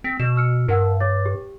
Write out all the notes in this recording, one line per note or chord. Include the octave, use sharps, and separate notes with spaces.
C4 B6
B2 E7
E6 F6 C#7
G2 A#4 F#5 E6
C#5 D6 A6
G4